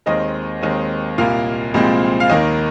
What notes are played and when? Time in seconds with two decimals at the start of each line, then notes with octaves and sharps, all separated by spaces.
0.06 D#2 D#3 G#3 C4 D#5
0.61 D#2 D#3 G#3 C4
1.18 C2 A#2 A#3 F5
1.74 C2 A#2 F3 G#3 C4
2.20 F5
2.30 D#2 D#3 A#3 D#5